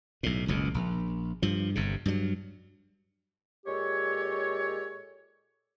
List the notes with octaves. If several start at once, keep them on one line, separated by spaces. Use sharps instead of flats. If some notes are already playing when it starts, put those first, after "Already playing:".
B1 A2
F#1 C#2 B2
A#1
G2 F3
G1 G2 C3
G2 F#3
A#2 G#3 G4 A4 C#5